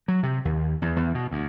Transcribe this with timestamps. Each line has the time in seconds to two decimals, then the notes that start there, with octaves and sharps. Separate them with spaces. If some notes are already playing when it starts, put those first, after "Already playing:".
0.08 F#3
0.23 C3
0.45 D#2
0.82 E2
0.96 E2
1.14 B2
1.31 D2